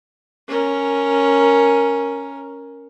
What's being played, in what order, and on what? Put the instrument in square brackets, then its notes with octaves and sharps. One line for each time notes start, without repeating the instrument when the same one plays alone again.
[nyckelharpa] C#4 A#4